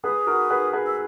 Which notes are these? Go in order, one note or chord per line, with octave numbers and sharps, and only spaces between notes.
G#4 B4 D#6
F#4 A#4
G#4 B4
G#4 B4
E6